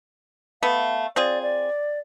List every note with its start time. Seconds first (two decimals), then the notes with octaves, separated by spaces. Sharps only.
0.63 A3 B3 F5
1.16 C4 F4 G#4 D5
1.42 D5